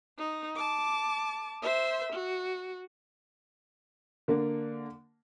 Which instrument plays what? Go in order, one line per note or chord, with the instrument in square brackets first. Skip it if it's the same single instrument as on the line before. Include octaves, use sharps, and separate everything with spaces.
[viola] D#4
A5 D6
C5 E5
F#4
[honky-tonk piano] D3 A#3